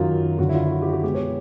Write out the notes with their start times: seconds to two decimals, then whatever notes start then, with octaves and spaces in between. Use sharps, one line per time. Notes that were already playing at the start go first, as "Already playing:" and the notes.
Already playing: F#2 D#3 F#3 F4
0.38 F#2 D3 F#3 F#4
0.49 E4
0.55 F4
0.67 F4
0.72 F#4
0.82 G4
0.89 F#4
0.93 G4
1.04 B2 G#3 G4
1.14 C#5